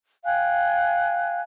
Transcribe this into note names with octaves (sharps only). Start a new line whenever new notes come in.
F5 G5 G#5 F#6